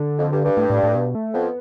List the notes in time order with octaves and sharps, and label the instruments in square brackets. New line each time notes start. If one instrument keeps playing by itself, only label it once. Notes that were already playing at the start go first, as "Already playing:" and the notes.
Already playing: [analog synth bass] D3
[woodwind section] F2
G2
G2
[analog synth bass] A2
A2
A2
B2
A3
[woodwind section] F2 [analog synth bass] B3